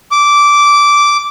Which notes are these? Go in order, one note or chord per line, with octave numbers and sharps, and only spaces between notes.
D6